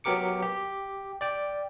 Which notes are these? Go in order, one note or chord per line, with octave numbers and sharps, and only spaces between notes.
F#3 B3 G4 A#4 D6 C#7
G4
D5 G5